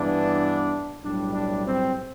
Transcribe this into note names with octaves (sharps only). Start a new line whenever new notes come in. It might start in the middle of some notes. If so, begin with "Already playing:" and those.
Already playing: G2 E3 B3 D4
B1 A2 G3 D4
D4
C4